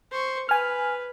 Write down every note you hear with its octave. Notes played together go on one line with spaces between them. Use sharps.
C5 C#6
B4 G#5 F6